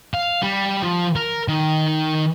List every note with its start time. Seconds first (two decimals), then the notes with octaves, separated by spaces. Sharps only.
0.14 F5
0.43 G3
0.83 F3
1.16 A#4
1.48 D#3